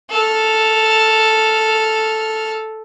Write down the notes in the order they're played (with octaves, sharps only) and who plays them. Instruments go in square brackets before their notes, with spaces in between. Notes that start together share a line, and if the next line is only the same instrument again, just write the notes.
[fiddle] A4 F6